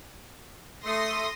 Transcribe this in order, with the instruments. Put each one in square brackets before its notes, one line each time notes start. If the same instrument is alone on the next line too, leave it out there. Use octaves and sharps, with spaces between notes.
[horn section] A3 [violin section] C6 D#6 A#6